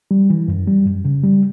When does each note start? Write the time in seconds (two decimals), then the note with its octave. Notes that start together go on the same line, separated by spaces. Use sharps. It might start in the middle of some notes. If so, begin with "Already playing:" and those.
0.11 G3
0.30 E3
0.48 F#2
0.68 G3
0.86 F#2
1.05 C#3
1.24 G3